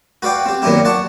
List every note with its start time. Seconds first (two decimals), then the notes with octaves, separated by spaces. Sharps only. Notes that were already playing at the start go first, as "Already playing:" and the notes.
0.22 F#4 B4 D5 F5 G5
0.46 C4 G4
0.62 A#2 D#3 F#3 B3 E4 G4
0.85 D5 F#5 A5 C#6